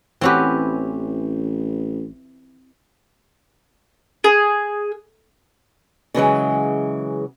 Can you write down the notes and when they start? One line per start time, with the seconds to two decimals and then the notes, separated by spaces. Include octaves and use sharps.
0.21 A1 E3 C4 C#4 F#4 G4 B4
4.24 G#4
6.14 C#3 E3 F#3 G#3